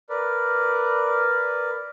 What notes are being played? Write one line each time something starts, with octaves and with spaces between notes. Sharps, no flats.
A#4 B4 D5